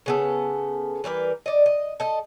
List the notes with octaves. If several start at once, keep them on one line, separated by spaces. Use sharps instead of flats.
C#3 B3 A4
E3 G3 A#4 B4
D5 D#5
D#5
A4 D#5